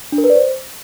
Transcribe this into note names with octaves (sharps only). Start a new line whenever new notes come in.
D4
A#4
B4
D5
C5